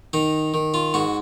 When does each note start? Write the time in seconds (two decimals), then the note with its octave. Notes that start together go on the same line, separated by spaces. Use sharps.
0.13 D#3 D#4
0.54 D#3
0.74 F4
0.94 G#2 F#4